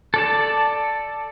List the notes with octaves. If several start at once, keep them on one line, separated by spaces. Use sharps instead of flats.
A4 D5 A5